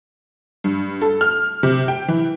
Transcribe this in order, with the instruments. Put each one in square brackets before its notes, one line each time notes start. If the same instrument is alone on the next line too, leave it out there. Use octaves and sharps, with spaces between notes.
[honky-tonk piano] G2
A4
F6
C3
G5
E3